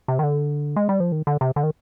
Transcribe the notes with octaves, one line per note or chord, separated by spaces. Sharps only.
C3
D#3
D3
G#3
G3
F3
D#3
D3
C3
D3
D#3